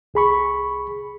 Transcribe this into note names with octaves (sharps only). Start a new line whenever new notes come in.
C2 G#4 B5 C#6